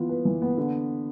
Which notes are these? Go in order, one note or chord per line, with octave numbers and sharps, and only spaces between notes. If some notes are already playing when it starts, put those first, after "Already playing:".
Already playing: E3 B3 F4
B4
E3
B3
D3